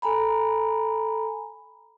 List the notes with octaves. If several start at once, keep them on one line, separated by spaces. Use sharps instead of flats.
A4 G#5 A#5 B5